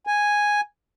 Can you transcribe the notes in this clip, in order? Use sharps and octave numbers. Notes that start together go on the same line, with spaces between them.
G#5